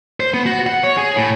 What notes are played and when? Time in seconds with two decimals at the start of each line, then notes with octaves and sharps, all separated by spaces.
0.20 C5
0.34 B3
0.46 F#4
0.67 F#5
0.83 C#5
0.97 G#4
1.16 A2